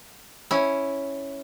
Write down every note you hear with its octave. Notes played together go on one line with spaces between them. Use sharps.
C#4 E4